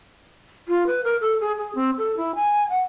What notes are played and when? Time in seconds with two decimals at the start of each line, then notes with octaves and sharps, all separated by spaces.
0.68 F4
0.87 B4
1.04 A#4
1.21 A4
1.41 G#4
1.58 G#4
1.75 C4
1.98 A4
2.17 E4
2.35 G#5
2.69 F#5